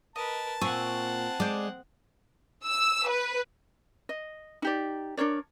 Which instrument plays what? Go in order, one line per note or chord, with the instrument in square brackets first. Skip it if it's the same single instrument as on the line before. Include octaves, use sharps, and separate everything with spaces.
[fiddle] A#4 B4 [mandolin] D#5 [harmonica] A5
[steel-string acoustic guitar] A#2 [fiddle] C4 F#5 [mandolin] G#5 C#6 E6
[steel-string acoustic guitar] G#3 [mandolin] C5 D5
[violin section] E6
B4
[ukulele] D#5
D#4 G4 D5
D4 A#4 C#5 D5